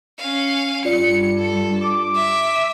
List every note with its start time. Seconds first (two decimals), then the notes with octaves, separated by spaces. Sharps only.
0.19 C#4 F5
0.85 G2 F4 D5 C#7
1.38 A4
1.81 D6
2.15 E5